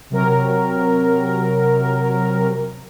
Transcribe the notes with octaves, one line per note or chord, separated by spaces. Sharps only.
C3 F#3 A#4